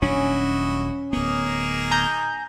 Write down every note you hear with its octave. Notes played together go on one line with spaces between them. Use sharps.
D#1 F#3 C#4 D4 E4 F#4 D#5
D1 A#3 B3 D#4 G#4
G#5 A#5 G6